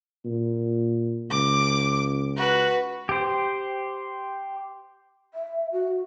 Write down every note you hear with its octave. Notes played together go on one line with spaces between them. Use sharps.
A#2
C#2 D6
F#4 B4
G4 C5
E5
F#4